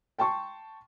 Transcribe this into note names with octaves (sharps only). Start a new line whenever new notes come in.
G5 A5 C6 C#6